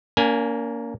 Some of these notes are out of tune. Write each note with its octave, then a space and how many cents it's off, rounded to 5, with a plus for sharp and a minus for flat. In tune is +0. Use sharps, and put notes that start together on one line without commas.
A#3 +0 C#4 +45 G#5 +0